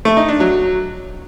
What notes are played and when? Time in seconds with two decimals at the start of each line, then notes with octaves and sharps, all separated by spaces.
0.05 A3
0.17 D#4
0.29 D4
0.40 F#3